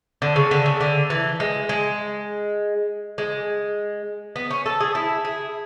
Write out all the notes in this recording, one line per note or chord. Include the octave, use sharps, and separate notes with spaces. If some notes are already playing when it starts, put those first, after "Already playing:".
D3
C#3
D3
C#3
D3
E3
G#3
G#3
G#3
B3
C#4
A4
G#4
E4
G#4